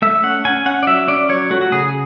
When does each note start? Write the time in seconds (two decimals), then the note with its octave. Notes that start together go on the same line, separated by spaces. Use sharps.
0.02 A3 E5
0.23 C#4 F#5
0.45 C#4 G#5
0.66 C#4 F#5
0.83 D5
0.87 F#3 E5
1.08 C#4 D5
1.29 F#3 C#5
1.50 A3 F#4
1.61 F#4
1.72 C#3 G#4